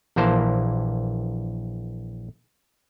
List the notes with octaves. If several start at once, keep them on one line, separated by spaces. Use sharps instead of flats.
A#1 E3 A#3 C5 A5